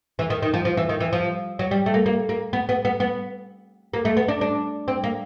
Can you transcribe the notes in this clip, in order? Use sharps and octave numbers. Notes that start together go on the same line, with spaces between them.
E3
D#3
D#3
F3
F3
E3
D#3
E3
F3
F#3
G3
A3
A#3
A#3
A#3
B3
B3
B3
B3
A#3
A3
B3
D4
D4
C4
A#3